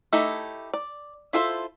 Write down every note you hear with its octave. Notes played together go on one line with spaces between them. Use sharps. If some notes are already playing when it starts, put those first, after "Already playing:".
A3 D#4 E4 G4 A4
D5
E4 F4 A4 C5 E5